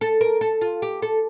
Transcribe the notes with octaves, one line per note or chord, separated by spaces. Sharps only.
A4
A#4
A4
F4
G4
A4